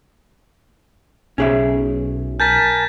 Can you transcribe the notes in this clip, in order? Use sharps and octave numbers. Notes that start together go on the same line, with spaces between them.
B1 C#4 G#4 E5
A#4 G#5 A5 G6 A6 B6